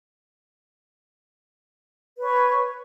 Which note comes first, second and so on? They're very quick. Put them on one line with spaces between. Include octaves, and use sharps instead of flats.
B4 C#5 C#6